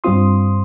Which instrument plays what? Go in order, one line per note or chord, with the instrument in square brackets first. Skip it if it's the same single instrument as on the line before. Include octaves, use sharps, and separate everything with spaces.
[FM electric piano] G2 G3 C4 F4 C6 D#6